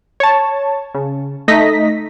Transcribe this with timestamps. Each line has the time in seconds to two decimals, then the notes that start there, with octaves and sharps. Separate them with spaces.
0.20 C#5 A5
0.94 C#3
1.48 A3 D#4 D#5 A#6 B6